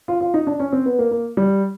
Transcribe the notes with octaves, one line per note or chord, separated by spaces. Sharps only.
F4
F4
D#4
D4
C#4
C4
B3
A#3
A#3
G3